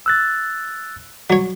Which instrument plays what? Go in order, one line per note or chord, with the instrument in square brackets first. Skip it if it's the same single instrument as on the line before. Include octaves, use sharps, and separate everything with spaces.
[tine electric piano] E6 F#6 A6
[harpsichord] F#3 C#5